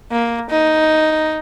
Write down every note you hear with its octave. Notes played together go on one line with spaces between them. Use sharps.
A#3
D#4